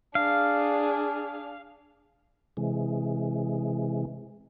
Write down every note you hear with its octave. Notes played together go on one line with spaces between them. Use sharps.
D4 G#4 F5
C3 E3 G#3